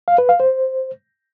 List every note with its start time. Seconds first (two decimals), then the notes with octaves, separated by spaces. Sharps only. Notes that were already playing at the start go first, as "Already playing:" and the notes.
0.08 F5
0.18 B4
0.29 F5
0.40 C5